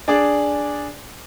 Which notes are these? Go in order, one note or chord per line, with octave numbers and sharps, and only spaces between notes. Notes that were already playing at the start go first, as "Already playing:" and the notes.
D4 G#4 D5